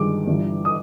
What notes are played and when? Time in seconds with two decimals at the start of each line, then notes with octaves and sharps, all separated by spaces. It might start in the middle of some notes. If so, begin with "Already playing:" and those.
Already playing: G1 G2 D#3 G#3 D6
0.27 G1 G2 E3
0.65 D#6